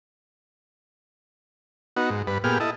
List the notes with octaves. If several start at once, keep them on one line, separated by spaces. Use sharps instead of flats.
B3 D#4 F#4
G#2
G2 B4
A#2 B3 G4 G#4 F6
E4 A4 D#5